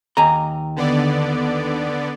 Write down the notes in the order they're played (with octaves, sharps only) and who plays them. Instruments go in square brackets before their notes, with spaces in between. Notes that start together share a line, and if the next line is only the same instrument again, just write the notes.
[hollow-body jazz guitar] D#2 G#5 A#5
[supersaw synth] D3 B3 D5